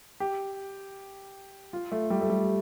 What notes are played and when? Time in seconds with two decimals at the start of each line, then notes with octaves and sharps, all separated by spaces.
0.20 G4
1.73 F4
1.92 A3
2.10 G3
2.21 A3
2.30 G3